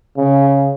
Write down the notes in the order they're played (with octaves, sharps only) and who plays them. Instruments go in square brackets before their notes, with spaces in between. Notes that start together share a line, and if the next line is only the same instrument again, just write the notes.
[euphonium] C#3